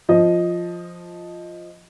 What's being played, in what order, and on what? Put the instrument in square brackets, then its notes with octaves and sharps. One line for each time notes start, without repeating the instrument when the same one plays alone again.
[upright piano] F3 D#5